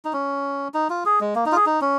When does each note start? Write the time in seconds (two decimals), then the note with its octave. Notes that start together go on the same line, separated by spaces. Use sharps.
0.05 D#4
0.13 C#4
0.74 D#4
0.90 F4
1.06 G#4
1.20 G#3
1.35 A#3
1.46 D#4
1.52 F4
1.56 G#4
1.66 D#4
1.81 C#4